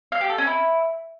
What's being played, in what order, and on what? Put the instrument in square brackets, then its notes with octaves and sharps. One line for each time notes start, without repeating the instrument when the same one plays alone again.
[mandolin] F5
G4
A4
C#4
E4